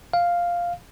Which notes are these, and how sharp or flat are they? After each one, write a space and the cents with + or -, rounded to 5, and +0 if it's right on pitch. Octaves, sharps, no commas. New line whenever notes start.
F5 +0